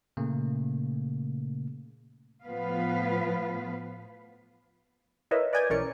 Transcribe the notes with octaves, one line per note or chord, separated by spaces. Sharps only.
A#2 C#3 A3 A#3
A2 F3 B3 B4 F5
E4 A#4 B4 C#5 D#5 E5
B4 D5 D#5 G#5 G6 G#6
B1 E3 C#4 A#4 D5 C#7